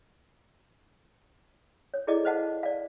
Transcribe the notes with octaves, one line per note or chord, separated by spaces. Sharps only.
C#5
E4 G#4 A4 D5 D#5 D6
B4 C5 D#5 F5 F#5 A5
D5 F5